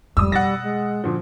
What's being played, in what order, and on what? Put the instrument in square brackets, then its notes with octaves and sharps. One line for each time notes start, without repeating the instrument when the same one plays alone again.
[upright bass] F2 G#2 [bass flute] G3 [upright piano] D#6 E6
[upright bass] B2 [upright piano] F#5 A6 A#6
[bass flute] G#3
[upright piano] A#2 D3 F3